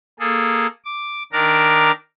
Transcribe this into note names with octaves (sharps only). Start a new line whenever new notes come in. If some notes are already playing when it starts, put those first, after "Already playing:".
A#3 G#4 A4
D6
D#3 D4 A#4 A#5 D6